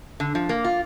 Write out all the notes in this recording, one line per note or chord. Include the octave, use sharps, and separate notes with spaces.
D3
F3
A#3
F4